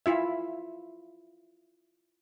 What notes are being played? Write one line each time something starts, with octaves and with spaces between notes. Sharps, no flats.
E4 F4 E5